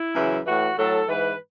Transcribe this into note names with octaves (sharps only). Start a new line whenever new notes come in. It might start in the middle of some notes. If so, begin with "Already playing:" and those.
Already playing: E4
F#2 C#3 E3
A2 E3 F#4
A2 F#3 A4
G#2 E3 B4